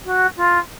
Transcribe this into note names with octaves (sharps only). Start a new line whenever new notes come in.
F#4
F4